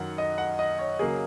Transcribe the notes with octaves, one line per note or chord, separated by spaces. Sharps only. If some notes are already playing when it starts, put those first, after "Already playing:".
Already playing: F#2 D#3 F#3 F#5
D#5
F#5
D#5
C#5
C#3 F#3 A#3 G#4